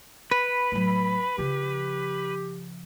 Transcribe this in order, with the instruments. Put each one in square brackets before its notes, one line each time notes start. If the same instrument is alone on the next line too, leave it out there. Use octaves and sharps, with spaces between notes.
[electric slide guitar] B4 [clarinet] B5
[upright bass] A2 F#3
[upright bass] C#3 F3 [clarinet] G4